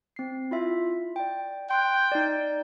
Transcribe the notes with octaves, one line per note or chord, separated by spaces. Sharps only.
C4 C7
E4 F4 E5
D5 G5
G5 C6 F#6
D#4 D5